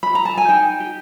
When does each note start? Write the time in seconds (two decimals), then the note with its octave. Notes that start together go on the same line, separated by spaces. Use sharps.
0.03 B5
0.15 A#5
0.25 A5
0.37 G#5
0.49 D#4 G5
0.80 G4